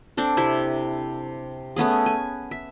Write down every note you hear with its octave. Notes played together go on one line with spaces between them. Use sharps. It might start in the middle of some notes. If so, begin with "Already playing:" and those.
C4 D4 A4
C3 E4 E5
A3 B3 C#4 G#4
G#5
E5